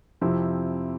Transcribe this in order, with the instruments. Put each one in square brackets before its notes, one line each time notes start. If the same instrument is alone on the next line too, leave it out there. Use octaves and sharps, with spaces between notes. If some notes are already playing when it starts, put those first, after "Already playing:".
[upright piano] F2 C3 F3 C4 E4